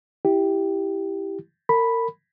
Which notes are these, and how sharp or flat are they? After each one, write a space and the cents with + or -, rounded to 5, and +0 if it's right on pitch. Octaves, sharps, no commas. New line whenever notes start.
E4 +0 G4 +0
A#4 -30 B5 +0